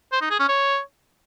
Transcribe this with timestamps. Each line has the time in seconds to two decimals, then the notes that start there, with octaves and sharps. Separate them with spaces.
0.12 C5
0.21 D#4
0.30 G#4
0.40 C#4
0.49 C#5